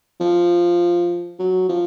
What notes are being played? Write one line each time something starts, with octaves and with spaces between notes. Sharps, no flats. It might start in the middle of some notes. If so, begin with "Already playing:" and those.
F3
F#3
F3